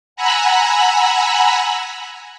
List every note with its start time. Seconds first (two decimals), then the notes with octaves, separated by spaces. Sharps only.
0.16 F#5 G#5 A#5 B5 E6 F#6